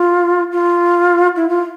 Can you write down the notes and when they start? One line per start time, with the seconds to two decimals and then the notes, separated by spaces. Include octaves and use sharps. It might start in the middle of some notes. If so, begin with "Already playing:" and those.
Already playing: F4
0.52 F4
1.36 E4
1.49 F4